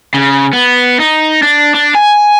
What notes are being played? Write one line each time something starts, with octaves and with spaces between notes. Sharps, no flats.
C#3
B3
D#4
D4
D4
G#5